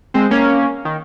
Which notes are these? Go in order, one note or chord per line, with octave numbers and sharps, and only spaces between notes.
G#3 C4
A#3 C#4
D#3